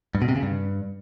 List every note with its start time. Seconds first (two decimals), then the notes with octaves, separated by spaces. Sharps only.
0.15 G2
0.22 B2
0.29 C3
0.36 C#3
0.43 G2